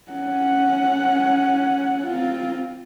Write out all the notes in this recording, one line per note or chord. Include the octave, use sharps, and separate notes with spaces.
C#4 F#5
C4 F4